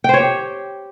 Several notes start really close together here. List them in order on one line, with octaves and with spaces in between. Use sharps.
G5 C5 C#5 G4